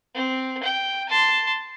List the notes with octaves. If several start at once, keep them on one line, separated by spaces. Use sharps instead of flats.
C4
G5
A5 C6